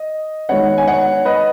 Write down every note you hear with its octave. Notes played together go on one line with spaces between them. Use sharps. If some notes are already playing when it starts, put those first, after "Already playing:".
Already playing: D#5
D#3 G#3 B3 C#5 F#5
G#5
C#5 F#5
B4 D#5